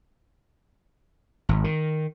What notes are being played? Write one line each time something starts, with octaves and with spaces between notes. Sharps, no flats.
G#1
D#3